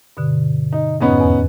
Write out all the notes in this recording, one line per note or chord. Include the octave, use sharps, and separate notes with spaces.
G2 B2 D3
D#4
F2 G#2 B3 C#4 D#4
E2 B4